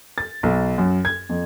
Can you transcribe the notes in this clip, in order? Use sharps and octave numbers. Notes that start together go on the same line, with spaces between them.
A6
B1
F#2
G#6
F2